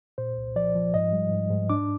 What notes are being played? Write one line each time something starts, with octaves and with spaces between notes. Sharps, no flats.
A#2 C5
C2
F3 D5
F3
G#2 D#5
G3
G#2
G#2
D4 D6